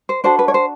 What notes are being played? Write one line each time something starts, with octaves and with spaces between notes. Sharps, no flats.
C5
D4 F#4 A4 C5
B4
C#5
C5